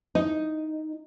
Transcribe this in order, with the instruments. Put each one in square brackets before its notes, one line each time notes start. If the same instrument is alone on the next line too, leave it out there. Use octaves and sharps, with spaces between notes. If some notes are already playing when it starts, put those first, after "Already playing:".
[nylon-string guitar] D#4